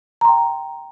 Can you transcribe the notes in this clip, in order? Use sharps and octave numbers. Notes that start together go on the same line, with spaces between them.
G5 A#5 C6